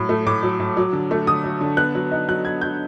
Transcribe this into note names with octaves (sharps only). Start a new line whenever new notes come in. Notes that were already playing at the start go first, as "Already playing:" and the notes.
Already playing: A2 F#3
A3
A2 D6
F#3
A2
F#3
D3
A3
D3 D#6
F#3
D3
B3 F#6
F#3
D#4
F#3 F#6
B3 G#6
F#3 G6